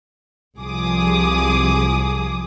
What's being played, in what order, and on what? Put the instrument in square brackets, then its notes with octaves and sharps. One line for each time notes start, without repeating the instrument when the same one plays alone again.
[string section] C2 F3 G#4 D6 D#6